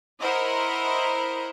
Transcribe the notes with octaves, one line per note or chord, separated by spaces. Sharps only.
E4 A#4 C5 D#5 F#5 B5